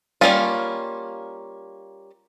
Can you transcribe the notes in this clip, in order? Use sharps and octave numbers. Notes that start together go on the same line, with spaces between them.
G3 A#3 C#4 F4